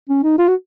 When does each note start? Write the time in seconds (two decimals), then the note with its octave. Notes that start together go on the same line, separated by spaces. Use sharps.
0.09 C#4
0.24 D#4
0.39 F4
0.48 F#4